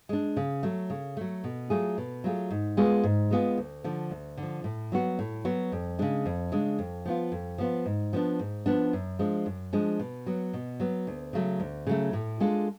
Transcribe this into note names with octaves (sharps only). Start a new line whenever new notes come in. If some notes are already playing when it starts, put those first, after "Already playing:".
G#3 D4
C#3
F#3 A3
C#3
F#3 A3
B2
F#3 A3 F4 G#4
B2
F#3 A3 F4 G#4
G#2
G#3 B3 F4 G#4
G#2
G#3 B3 F4 G#4
D2
D3 F3
D2
D3
F3
A2
F#3 B3 F#4
A2
F#3 B3 F#4
F2
C#3 G#3 D4
F2
C#3 G#3 D4
F2
F3 B3 F4
F2
F3 B3 F4
G#2
F3 B3 D4
G#2
F3 B3 D4
F#2
F3 G#3 D4
F#2
F3 G#3 D4
B2
F#3 B3
B2
F#3 B3
D2
C#3 F#3 A3
D2
C#3 F#3 A3
A2
G#3 D4 F4 A4